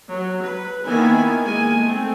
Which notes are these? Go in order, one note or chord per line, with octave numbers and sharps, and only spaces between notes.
F#3
B4
D#3 A#3 B3 E4 G#5
G#3 A#3 G#5
A3 C4